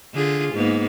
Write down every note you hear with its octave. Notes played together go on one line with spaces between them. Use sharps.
D3 F4 G#4
G#2 A#3 B3